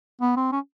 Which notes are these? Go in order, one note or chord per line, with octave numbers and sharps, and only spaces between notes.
B3
C4
C#4